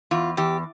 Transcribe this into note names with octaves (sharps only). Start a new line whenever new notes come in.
E2 F4
E2 G4